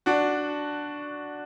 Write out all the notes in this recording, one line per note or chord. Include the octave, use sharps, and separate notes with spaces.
D4 F#4